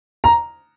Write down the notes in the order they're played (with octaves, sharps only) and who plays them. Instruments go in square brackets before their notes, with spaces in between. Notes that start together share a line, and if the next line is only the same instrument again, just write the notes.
[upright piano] A#5